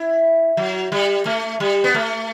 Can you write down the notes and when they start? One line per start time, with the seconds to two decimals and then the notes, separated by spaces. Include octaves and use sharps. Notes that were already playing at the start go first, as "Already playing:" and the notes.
Already playing: E4
0.57 F#3
0.92 G3
1.26 A3
1.60 G3
1.84 B3
1.94 A3